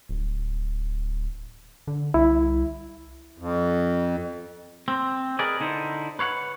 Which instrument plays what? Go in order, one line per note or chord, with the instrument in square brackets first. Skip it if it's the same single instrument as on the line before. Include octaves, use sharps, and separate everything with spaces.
[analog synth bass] D1
D3
[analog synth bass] C2 [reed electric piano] E4
[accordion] F2
[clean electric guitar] C4
G#4 A#4 B4 D5 D#5 G#5
D3 D#4 E4 C5
B4 C#5 F5 F#5